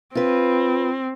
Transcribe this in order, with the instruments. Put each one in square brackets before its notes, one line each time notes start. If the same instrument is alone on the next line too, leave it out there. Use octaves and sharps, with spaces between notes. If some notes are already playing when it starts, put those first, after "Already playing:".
[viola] C4 [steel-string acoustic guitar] F4 B4